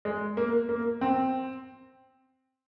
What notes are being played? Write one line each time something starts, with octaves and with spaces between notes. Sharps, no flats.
G#3
A#3
A#3
C4